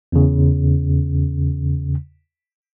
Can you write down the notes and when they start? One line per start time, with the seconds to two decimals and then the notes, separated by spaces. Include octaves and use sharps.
0.12 E2 C#3